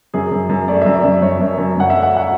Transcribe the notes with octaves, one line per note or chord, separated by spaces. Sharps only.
F#2 G#4
F#2
F#2
A3 D5
F#2 E5
D5
F#2
F#2 C#5
F#2
F#2
F#2 F#5
A3 E5
F#5
F#5